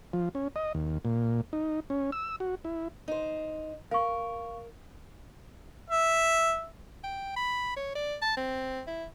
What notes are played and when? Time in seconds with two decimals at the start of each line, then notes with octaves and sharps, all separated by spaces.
0.13 F3
0.35 C#4
0.56 D#5
0.75 D#2
1.05 A#2
1.53 D#4
1.90 C#4
2.12 E6
2.40 F#4
2.65 E4
3.08 D#4 C5
3.91 A#4 F5 C#6
5.90 E5
7.03 G5
7.36 B5
7.77 C#5
7.95 D5
8.22 A5
8.37 C4
8.87 E4